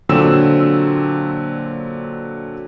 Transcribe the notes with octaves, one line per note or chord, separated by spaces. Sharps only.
A#2 D3 F#3 C4 E6 E7